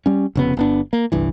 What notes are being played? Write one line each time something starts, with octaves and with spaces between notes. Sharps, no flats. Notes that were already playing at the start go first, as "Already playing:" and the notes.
G3 C#4
F1 C#3 B3
G1 B3 D4
A#3
G1 C2 G2 E3